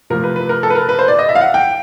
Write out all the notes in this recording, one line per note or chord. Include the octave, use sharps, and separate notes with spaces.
C3 F3 A3 A#4
B4
B4
A#4
A4
B4
A#4
B4
C5
D5
D#5
E5
F5
F#5
G5